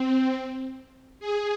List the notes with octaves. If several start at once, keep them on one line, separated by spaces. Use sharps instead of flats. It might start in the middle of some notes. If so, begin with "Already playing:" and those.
Already playing: C4
G#4